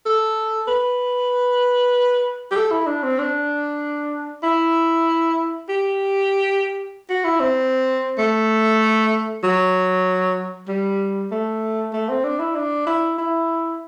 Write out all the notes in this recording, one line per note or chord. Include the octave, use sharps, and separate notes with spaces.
A4
B4
G4
A4
E4
D4
C4
D4
E4
G4
F#4
E4
C4
A3
F#3
G3
A3
A3
C4
D4
E4
D4
E4
E4